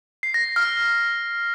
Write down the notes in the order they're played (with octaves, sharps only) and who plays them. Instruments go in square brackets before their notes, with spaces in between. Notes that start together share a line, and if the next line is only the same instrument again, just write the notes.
[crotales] C7
A#6
F6